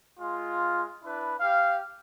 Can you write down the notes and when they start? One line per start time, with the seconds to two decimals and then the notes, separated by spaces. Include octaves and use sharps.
0.20 G#3 F4
1.04 D4 E4 B4
1.40 G4 F5